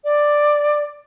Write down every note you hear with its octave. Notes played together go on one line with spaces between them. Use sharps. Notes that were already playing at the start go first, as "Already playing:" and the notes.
D5